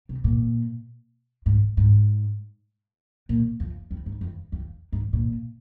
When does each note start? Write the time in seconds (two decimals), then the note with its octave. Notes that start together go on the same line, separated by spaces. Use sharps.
0.09 C3
0.24 A#2
1.46 G#2
1.77 G#2
3.29 A#2
3.60 F2
3.91 F2
4.06 G#2
4.21 F2
4.52 F2
4.93 G#2
5.13 A#2